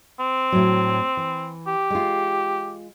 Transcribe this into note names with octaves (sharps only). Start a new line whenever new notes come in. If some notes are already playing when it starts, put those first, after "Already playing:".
C4
A2 F#3
E3
G4
G#3 F4